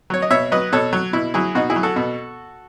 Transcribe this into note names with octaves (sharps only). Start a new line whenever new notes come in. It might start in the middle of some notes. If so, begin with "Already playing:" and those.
F#3 C#5
D#5
B2 C#5 E5
F#3 B4 D#5
B2 A4 C#5
F#3
B2 E4
F#3 E4 G#4
B2 D#4 F#4
E4 G#4
F#3
F#4 A4
B2